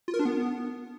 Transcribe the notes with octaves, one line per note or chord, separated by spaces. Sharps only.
F4
A#4
D4
B3